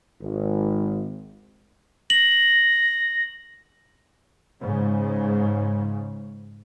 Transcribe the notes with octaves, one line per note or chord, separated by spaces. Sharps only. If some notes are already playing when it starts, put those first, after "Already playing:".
G#1
A#6 F#7
G#2 C#3